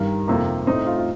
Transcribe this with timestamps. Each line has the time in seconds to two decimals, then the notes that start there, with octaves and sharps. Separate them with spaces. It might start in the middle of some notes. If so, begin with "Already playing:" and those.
Already playing: G2 D#3 G3 A#4
0.28 F2 C3 D#3 A#3 G4
0.67 A2 A3 C4 D#4
0.87 F4
0.98 F4